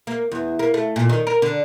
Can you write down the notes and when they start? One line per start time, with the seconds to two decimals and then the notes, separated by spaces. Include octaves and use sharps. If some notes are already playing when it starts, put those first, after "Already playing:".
0.07 A#3
0.32 E2
0.59 A#3
0.74 A3
0.96 A#2
1.09 D#3
1.27 A#4
1.42 D3